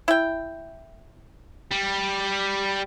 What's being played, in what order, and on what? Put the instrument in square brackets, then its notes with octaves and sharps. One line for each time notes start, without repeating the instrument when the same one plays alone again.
[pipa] E4 G5
[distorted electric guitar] G3